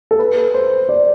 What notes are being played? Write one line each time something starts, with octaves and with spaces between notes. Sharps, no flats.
A4
B4
C5
D5